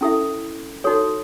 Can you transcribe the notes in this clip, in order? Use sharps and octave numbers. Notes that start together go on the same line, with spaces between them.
C#4 E4 A4 E5
D#4 F#4 A4 C#5